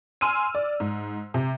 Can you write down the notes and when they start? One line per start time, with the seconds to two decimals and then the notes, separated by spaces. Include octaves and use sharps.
0.21 G#5 C6 E6 F6 D#7
0.55 D5
0.80 G#2
1.34 C3